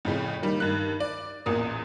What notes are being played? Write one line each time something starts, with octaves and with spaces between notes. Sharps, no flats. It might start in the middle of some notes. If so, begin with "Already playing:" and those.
F2 A2 C#3 C#4
D#3 G3 A#3
G2 D#3 F#6
D5
A1 E2 A#2 A#4 D#6